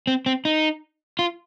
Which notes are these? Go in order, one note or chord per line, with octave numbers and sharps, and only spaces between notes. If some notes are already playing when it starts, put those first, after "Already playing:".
C4
C4
D#4
F4